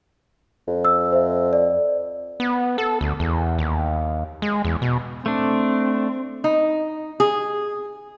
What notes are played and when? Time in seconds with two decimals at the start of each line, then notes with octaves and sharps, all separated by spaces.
0.68 F2
0.85 E6
1.12 C5 E5
1.53 D5
2.40 B3
2.78 A4
3.01 D2
3.20 E2
3.58 D#2
4.42 G#3
4.65 E2
4.82 B2
5.26 A3 C4 D4
6.44 D#4
7.20 G#4